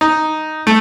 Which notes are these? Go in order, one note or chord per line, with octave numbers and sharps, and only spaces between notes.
D#4
A3